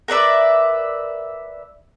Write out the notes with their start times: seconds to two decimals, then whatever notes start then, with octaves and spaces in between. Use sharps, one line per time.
0.08 A#4 B4 D5 E5